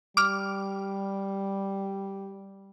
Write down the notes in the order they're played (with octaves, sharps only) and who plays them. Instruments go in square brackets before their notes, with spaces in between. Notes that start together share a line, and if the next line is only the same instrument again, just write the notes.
[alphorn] G3 [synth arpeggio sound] D6 F6